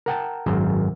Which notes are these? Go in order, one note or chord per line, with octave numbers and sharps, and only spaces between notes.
A#4 F#5 G5 A5
G#1 F#2 C5 A#5